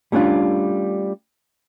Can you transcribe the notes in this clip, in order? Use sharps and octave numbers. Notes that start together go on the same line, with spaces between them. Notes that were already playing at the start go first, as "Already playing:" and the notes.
G3 A3 C#4 D4 F4